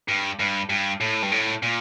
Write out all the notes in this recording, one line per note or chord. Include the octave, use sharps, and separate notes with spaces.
G2
G2
G2
A2
G2
A2
A#2